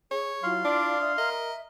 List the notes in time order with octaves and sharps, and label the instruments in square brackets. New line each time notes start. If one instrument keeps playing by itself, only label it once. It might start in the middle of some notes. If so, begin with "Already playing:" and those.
[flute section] G#4 [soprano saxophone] C#5
[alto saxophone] F#3 [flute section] E4 F4 [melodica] F5 C6
[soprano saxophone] D4 [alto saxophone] D5
[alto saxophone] D4 [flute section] D5 E5 D#6
[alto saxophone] A#4 [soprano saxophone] D#5 [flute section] E5